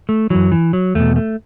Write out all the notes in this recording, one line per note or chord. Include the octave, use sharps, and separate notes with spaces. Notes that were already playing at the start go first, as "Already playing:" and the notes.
A3
F#2 E3 F#3
E3
F#3
E2 B2 A3
A3